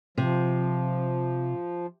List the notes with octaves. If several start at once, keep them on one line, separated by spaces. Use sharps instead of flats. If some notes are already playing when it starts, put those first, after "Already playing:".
C3 F3